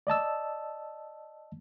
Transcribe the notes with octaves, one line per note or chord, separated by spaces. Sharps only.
D5 D#5 A5 E6